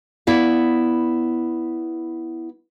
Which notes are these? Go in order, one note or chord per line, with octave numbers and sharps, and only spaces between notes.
B3 E4 D5 F5